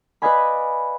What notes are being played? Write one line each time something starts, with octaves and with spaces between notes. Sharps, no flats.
B4 D5 D#5 F5 G#5 B5